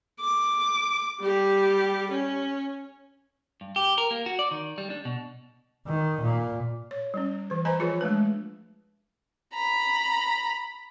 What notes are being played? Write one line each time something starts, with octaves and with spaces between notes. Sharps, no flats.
D6
G3 G4
C#4
G2
G4
A#4
A#3
F#4
D5
D#3
G3
D4
B2
D#3
A#2
C#5
G3 C#4
E3 C5
B4 C5 D#5 G#5 A#5 B5
F3 F4 G#4 B4 C#5
G#3 A3 D4 B4
A#5 B5